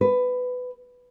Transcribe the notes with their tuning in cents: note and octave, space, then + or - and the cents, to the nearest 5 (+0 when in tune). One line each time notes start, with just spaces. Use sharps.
B4 +15